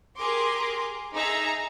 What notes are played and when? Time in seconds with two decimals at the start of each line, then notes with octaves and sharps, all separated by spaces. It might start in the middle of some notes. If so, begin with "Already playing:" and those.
0.17 G4 G#4 A#4 C6 D6
1.14 D#4 G#4 E5 A#5